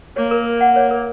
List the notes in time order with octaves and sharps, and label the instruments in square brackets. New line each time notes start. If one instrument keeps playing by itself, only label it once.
[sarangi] A#3 [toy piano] C#5
[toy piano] A#4
A#4
F#5
C#5
A#4